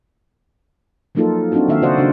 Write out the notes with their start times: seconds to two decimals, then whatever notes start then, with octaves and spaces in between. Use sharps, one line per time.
1.15 F3 F#3 A#3 D#4 F4 A4
1.52 C4 D4 D#4 F4 F#4
1.68 D#3 A#3 E5 F5
1.82 C#3 F#4 C5 D5 D#5 F#5
1.98 C#3 D4 F#4